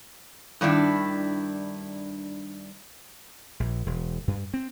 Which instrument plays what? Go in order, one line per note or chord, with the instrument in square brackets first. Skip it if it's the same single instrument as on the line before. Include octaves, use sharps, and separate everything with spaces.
[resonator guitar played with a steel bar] G2 D#3 D4 E4
[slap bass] A#1
E1
G2
C4